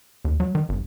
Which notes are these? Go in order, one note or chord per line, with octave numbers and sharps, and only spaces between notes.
D#2
F#3
D#3
G1